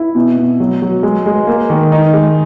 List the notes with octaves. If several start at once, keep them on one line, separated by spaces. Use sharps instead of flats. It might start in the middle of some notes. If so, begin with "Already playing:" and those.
Already playing: E4
B2
B2
F#3
F#3
G#3
G#3
A#3
D#3
D#4
G#3